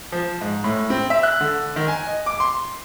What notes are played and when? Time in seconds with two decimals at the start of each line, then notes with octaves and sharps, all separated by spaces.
0.12 F3
0.41 G#2
0.64 A2
0.90 C4
1.10 E5
1.23 F#6
1.41 D3
1.76 D#3
1.88 G#5
2.07 D#5
2.26 D6
2.40 C6